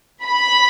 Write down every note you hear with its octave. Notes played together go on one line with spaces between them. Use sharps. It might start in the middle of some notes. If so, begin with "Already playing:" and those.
B5